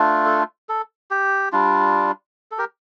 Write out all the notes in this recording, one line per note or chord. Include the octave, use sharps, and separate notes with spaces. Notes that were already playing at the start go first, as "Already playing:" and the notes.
Already playing: A3 D4 F4
A4
A4
G4
G3 D4 F4
A4
G4 A#4